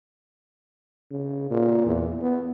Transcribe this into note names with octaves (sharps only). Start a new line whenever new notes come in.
C#3
A#2
E2
B3